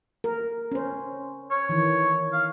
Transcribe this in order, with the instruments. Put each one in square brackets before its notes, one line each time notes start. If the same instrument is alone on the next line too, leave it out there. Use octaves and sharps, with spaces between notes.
[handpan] A#4
C#4 C5
[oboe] C#5
[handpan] D#3 E3
[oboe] F5